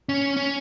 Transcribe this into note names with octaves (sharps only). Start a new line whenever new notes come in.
C#4
C#4